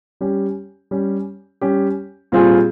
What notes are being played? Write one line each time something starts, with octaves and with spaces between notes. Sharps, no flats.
G3 C#4 G4
G3 C#4 G4
G3 C#4 G4
A#2 G3 C4 F4 G#4